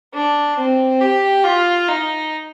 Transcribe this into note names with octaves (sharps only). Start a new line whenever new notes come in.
D4
C4
G4
F4
D#4